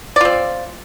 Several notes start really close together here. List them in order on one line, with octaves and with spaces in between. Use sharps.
D5 F4 C4